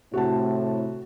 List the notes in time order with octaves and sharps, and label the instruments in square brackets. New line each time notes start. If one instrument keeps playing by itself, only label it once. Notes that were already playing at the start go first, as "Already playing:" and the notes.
[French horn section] A2 C3 [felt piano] F#4 A5